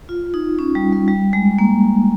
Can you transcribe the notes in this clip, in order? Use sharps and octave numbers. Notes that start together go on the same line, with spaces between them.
F4
D#4
C#4
G3
G3
G3
G#3
A#3